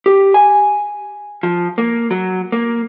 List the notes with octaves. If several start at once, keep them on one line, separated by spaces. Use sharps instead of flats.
G4
G#5
F3
A#3
F#3
A#3